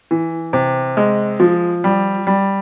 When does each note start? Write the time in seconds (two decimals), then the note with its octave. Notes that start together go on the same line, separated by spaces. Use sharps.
0.11 E3
0.53 C3
0.97 G#3
1.40 F3
1.84 G3
2.27 G3